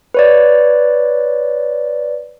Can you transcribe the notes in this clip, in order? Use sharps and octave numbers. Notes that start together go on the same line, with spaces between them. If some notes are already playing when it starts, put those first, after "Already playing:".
B4 C#5 D5